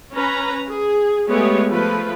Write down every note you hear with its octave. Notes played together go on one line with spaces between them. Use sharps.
C#4 B4 A#5
G#4
G#3 A3 B3 G4 G#4 C#5
F3 A3 F4 B4